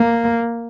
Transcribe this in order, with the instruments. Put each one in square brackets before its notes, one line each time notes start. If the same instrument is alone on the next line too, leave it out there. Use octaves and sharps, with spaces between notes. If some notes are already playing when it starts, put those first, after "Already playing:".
Already playing: [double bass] A#3